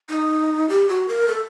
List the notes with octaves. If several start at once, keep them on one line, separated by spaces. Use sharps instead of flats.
D#4
G4
F#4
A#4
A4